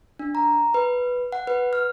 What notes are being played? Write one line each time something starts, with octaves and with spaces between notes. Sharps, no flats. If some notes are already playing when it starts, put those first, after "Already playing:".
D4
A#5
B4
F#5
B4
F6